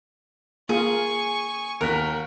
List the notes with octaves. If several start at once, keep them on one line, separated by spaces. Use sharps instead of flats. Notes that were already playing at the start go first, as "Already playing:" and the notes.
A#3 F4 G#4 G#5 C#6
D#2 F#4 A#4 F#6 B6